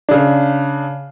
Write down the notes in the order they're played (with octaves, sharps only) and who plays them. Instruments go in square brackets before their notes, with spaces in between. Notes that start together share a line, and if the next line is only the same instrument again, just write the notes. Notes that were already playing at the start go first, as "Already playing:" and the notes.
[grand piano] C#3 D4